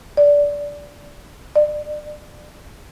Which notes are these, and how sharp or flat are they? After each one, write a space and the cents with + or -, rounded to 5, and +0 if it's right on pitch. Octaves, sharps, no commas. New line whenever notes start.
D5 -15
D5 +30